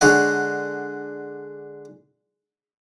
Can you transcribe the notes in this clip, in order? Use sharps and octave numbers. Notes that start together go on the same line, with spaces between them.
D3 G#3 C#5 D#5 F#5